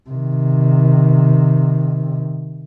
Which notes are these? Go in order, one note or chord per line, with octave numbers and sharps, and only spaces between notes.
C3 D#3